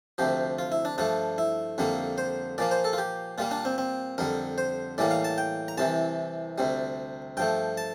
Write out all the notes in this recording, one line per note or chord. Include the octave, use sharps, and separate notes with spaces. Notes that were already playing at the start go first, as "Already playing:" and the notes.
D2 C3 F3 G4
F4
E4
D4
G2 F3 A3 D4
E4
F2 D3 G3 A#3
C5
A#2 F3 A#3 D5
C5
A4
F4
G4
A#2 G3 A#3 F4
D4
C4
C4
F2 D3 G3 A#4
C5
A2 E3 G3 A#3 D5
F5
A5
G5
A#5
C2 C3 E3 A5
D2 C3 G3
G2 F3 A3 G5
A5